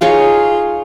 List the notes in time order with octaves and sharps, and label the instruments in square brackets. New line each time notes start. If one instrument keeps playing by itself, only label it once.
[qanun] D#4 G#4 C#5 [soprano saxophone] F4